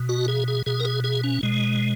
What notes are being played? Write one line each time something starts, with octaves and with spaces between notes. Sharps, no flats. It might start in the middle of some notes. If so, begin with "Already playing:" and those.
Already playing: B2
F#4
G#4
G#4
B2 G#4
A#4
G#4
G#4
C#4
B2 G#3